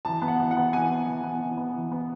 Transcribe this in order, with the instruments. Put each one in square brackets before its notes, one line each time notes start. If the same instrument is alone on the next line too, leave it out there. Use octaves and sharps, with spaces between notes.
[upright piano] E3 A5
B3
F#5
E3
F#5
B3
E3 G#5
B3
E3
B3
E3
B3
E3
B3